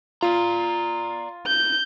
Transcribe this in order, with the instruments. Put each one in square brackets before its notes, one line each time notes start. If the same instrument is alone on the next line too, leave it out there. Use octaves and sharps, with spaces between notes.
[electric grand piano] F4 [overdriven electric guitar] D5 A#5
[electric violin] G6